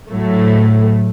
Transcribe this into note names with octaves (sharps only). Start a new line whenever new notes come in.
A2 F#3 A3